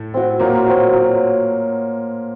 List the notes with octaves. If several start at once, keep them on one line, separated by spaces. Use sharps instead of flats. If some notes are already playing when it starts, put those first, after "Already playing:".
Already playing: A2 A3
C4 F#4
A#2 F#3 A#3
C4 F#4
F#3